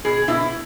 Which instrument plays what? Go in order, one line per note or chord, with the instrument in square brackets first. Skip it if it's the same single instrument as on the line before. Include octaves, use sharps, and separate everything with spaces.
[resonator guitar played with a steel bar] B2 G#4
B2 E4